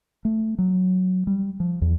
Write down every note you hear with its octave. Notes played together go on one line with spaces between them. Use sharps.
A3
F#3
G3
F3
E2